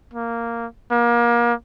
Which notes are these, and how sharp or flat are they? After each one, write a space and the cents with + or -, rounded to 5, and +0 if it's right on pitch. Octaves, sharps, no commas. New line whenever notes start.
A#3 -5
A#3 +30